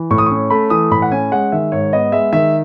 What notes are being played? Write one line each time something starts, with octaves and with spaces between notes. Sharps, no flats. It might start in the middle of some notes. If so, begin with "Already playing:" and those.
Already playing: E3
A2 C#6
D#6
C#4 C#6
A3 B5
E3 D#6
A2 B5
F#5
C#4 G#5
G#3 F#5
D#3 E5
G#2 C#5
B3 D#5
G#3 E5
D#3 E5